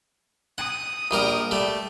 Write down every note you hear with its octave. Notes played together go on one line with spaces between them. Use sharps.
F#5 D#6
A#1 G3 A#4
G3 A3